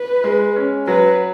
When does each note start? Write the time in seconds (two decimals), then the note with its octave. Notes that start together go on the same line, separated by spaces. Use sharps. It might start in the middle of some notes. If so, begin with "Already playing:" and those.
Already playing: B4
0.24 G#3
0.56 C#4
0.87 F#3 B4